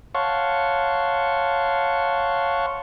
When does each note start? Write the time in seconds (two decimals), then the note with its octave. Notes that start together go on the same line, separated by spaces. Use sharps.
0.15 C#5 F5 F#5 A5 C6 C#6